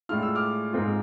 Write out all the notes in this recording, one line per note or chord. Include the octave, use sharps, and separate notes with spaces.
A2 G#3 D4 F4 F6
E6
D6 F6
G#2 G#3 C4 F4